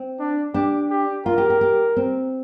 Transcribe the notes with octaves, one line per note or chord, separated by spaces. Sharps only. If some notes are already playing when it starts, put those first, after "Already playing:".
Already playing: C4
D4
D4 G4
G4
F4 A#4
G4
G4
G4
C4